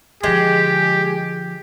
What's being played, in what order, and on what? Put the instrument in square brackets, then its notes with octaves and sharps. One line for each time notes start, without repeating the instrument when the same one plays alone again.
[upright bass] D3 F3 [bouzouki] G#3 [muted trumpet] G4